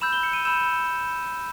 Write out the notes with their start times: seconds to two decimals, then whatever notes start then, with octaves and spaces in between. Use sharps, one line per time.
0.01 B5 E6 G6 E7
0.13 G7
0.23 C#7
0.33 D#7
0.45 B5 E6 G6 E7